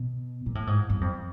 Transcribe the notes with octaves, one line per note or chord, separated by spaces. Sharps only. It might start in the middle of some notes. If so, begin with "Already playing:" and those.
Already playing: B2
A#2
A2
G#2
G2
F2